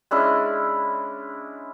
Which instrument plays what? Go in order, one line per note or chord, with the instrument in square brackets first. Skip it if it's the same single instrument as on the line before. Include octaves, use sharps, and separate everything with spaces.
[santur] G#3 C#4 D4 E4